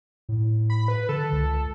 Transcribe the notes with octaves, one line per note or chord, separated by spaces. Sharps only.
A2
B5
B4
D3 A4
C#2